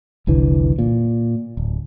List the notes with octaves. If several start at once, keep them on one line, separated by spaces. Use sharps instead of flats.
F1 C2 D3 E3
A#2
D1